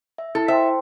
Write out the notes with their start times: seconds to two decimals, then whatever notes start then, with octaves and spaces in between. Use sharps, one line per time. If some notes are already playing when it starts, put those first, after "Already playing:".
0.18 E5
0.35 E4 A4
0.48 C5 E5 G5 C6